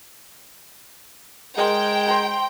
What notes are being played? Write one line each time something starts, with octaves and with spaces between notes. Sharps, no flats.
G#3 A#4 C5 G5
C5 A#5 B5